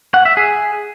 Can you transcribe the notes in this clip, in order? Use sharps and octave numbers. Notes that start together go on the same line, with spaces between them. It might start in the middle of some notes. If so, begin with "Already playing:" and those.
F#5
E5
G#4